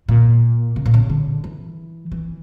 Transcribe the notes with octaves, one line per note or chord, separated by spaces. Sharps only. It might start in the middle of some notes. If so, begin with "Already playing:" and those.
A#2
C#3
A#2
C#3
D3
E3
E3